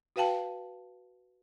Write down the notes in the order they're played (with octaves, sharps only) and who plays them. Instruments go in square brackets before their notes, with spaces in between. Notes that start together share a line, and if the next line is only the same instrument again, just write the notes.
[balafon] F#4 B4 F5 G5 A5